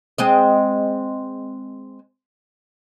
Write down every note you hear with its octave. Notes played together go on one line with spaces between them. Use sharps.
G#3 C4 D#5